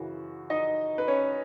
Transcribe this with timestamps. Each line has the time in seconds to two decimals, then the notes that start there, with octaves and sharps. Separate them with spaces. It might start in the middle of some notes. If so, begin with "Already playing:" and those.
Already playing: F#2 C#3 E3 F#4
0.50 D#4 D#5
0.98 B4
1.08 C#4 C#5